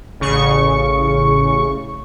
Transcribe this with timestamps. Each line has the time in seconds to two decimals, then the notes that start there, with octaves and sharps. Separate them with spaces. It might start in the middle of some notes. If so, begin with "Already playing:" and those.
0.20 A1 C#3 C#6